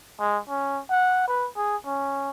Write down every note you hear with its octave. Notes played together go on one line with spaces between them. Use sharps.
G#3
C#4
F#5
B4
G#4
C#4